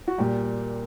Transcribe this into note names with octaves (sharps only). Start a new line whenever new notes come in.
F#4
A#2 G3 G4